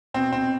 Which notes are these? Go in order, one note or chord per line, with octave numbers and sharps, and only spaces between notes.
B2 C4
C4